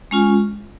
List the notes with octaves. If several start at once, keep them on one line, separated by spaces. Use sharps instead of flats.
G#3 C#4 F4 G#5